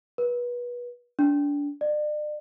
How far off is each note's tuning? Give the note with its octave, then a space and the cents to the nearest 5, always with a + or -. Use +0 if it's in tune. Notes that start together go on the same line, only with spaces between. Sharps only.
B4 -25
D4 -30
D5 +40